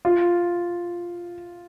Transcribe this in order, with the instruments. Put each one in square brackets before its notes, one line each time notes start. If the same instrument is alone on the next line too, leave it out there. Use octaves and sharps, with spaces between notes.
[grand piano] F4